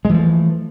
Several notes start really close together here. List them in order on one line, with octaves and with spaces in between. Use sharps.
G#3 E3 F3 A3